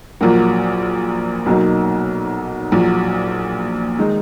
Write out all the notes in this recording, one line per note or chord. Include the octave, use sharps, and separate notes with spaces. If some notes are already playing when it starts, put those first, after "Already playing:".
A#1 A#2 F#3 A#3
B1 B2 F#3 A#3 D#4
A#1 A#2 F#3
D#3 G#3 D#4